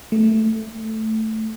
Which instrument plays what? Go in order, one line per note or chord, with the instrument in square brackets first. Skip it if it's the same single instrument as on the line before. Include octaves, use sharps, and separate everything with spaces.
[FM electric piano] A3